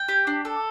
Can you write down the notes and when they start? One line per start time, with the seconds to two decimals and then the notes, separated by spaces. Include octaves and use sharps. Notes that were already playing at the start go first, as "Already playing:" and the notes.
Already playing: G5
0.08 G4
0.27 D4
0.45 A4